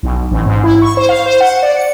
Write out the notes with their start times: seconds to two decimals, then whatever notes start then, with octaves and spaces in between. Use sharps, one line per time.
0.03 B1
0.31 A1
0.46 G#2
0.64 E4
0.82 C#6
0.97 C5
1.09 F5
1.26 C5
1.40 F#5
1.63 D5
1.77 C#7